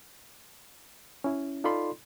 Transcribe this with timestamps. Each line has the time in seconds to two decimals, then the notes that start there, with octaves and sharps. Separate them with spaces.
1.24 C#4 E4
1.64 D#4 F4 A4 D5 B5 C6